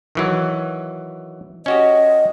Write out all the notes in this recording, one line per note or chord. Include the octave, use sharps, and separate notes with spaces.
D#3 E3 F#3
C#4 F#4 G4 D#5